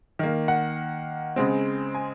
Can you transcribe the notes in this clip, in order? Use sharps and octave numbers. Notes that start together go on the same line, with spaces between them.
D#3 A#3
F#5
C#3 G#3 C4
G#5